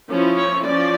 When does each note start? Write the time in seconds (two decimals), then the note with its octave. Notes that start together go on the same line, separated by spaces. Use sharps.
0.10 F3 C#4 E4
0.37 C#5
0.66 F3 C#4 D5